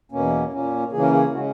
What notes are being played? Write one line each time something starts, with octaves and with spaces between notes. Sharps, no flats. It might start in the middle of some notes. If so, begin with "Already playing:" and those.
E2 B2 A#3 C#4
A#2 A#3 C#4
C#3 E3 A#3 C#4 G#4
A#4
G#4
C#3 G#3 C#4 F#4